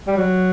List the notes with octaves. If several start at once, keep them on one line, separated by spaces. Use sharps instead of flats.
G3
F#3